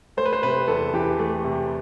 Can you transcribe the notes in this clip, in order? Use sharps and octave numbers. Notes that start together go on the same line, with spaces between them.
A3 C5
B4
C5
C3 B4
E2 A4
E3 G4
A3
C3